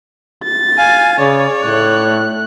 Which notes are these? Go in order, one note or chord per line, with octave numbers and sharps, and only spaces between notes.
A6
F5 G#5
C#3 C#5 D5
A2 A3 F#6